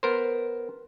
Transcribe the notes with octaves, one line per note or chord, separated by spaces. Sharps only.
B3 A#4 C5